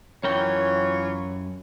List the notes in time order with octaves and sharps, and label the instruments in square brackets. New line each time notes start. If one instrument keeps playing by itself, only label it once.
[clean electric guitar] F#2 A#4 G5 [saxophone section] E3 F4 C#5